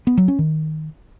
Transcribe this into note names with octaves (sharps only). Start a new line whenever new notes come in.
B3
F#3
C#4
D#3